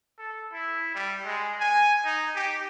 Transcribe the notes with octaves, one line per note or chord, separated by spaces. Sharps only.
A4
E4
G3
G#3
G#5
D#4
G4